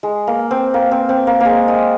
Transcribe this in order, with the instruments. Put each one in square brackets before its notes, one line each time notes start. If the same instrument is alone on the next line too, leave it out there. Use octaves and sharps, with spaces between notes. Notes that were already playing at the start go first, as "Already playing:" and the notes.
[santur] G#3
A#3
C4
A#3
C4
C4
A#3
G#3 A#3
G#3